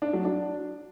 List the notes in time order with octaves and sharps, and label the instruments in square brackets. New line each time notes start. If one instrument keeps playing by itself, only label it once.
[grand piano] D4
F#3
D4